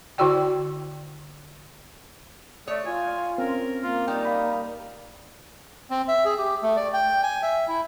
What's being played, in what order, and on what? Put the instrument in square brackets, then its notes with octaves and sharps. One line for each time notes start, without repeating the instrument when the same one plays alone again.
[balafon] D3 E4 F#4 D5 G5
[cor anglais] A3 [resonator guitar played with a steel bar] C#5 [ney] D5 [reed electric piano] D#6
[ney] F4 [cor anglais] G#5
[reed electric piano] C4 C#4 [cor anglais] A#4
[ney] A#3 [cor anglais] F4
[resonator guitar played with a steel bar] G3 [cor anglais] D#4 [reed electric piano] G5
[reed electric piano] F5 B5 D#6
[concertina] C4
E5
G#4
G4
A3
D5
G5
G#5
E5
E4